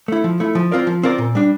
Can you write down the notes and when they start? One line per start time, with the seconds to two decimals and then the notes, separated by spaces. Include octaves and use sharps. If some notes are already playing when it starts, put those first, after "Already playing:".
0.08 A3 E4
0.24 F3
0.40 A3 E4
0.55 F3
0.72 C4 F4 A#4 D5
0.87 F3
1.03 C4 F4 A#4 D5
1.18 A#2
1.35 G3 D4